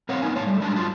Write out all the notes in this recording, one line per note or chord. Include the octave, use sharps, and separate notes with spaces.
C4 A#4 C#5 F5 F#5
A#3 B3 D#4 G#5
A2 C#5 F5 A5
G3 A3
G3 G#3 D4 A5
G2 F#3 F4 A5